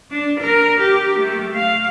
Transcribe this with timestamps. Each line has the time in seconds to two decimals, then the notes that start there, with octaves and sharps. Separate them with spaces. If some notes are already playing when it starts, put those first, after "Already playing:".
0.11 D4
0.40 A#4
0.80 G4
1.19 A3
1.55 F5